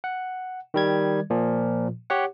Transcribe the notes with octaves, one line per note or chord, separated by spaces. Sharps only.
F#5
D#3 G3 G#6
A#2 F3
G4 C#5 F#5